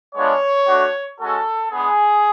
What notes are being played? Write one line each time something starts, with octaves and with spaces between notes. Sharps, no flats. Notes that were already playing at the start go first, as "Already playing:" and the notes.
G#3 B3 D4 F4 C#5
A3 D4 F#4
G#3 C#4 F#4 A4
G#3 B3 D4 G#4